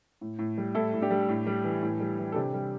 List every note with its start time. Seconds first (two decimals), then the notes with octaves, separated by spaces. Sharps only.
0.21 A2
0.39 A2
0.58 G3
0.75 A2 E4 A4
0.93 A2
1.02 D4 G4
1.11 G3
1.29 A2
1.47 G3
1.64 E3
1.83 A2
2.00 G3
2.19 E3
2.32 A4
2.36 C3 D4 G4
2.54 G3